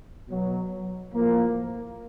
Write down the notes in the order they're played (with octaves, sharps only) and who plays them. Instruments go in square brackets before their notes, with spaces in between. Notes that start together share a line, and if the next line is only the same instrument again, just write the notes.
[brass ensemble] B2 F#3
A2 F3 A#3